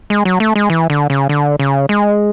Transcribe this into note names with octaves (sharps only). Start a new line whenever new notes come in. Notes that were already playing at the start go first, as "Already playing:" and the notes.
G#3
F#3
A3
G#3
E3
D3
C#3
D3
C#3
G#3